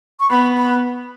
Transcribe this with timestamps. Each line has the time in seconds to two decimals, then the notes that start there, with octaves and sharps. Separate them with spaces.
0.19 C#6
0.30 B3 B5
0.56 B5